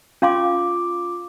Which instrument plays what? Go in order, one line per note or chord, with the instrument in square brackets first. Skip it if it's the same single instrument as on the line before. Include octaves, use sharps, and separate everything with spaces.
[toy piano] C#4 F5 C6 [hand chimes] F4 D6